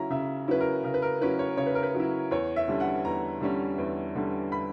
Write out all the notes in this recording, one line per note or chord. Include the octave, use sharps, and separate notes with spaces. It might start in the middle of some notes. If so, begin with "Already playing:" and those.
Already playing: C#3 F#3 C#4 E4 A#5
C#3 E5
F#3 C#4 E4 B4
A#4
C#3 A#4
B4
A#4
F#3 C#4 E4 B4
C#5
C#3 C#5
B4
A#4
B4
F#3 C#4 E4
E2 C#5
E5
D3 G3 C#4
F#5
E2 A#5
D3 G3 C#4
E2
D3 G3 C#4
B5